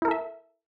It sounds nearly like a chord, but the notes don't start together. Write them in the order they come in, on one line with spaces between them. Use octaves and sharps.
E4 A#4 A4 E5